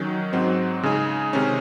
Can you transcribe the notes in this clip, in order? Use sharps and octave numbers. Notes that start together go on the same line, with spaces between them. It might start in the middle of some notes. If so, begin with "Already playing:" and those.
Already playing: D#3 F#3 C#4
G#2 F#3 C4 D#4
C#3 G#3 D#4 G#4
C3 D#3 G#3 C#4